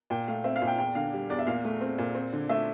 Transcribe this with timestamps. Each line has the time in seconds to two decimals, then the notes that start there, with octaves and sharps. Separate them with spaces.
0.10 A#2 G5
0.28 A3 F5
0.44 C4 E5
0.56 F5
0.62 A#2
0.67 G5
0.78 E2 G5
0.95 D3 F5
1.13 G3
1.30 E2 D5
1.39 E5
1.46 A#2 F5
1.65 A3
1.81 C4
1.98 A#2
2.15 C4
2.33 D3
2.49 A3 E5